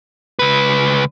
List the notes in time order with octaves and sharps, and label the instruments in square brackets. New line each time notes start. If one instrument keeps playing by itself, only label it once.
[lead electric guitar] C#2 B4